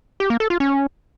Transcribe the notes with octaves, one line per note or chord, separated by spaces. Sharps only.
G4
A#3
A4
F4
C#4